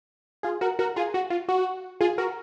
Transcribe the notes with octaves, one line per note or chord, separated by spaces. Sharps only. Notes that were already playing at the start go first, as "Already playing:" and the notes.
F4 G#4
F#4 A#4
F#4 A#4
F4 G#4
F#4
F4
F#4
F4 G#4
F#4 A#4